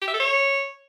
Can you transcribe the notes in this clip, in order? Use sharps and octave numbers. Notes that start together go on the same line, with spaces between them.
G4
E5
A4
C#5